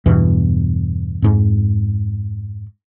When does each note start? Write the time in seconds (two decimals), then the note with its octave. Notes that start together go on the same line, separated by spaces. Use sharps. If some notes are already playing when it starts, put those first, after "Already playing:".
0.06 E2 G2 B2 E3
1.22 F2 G#2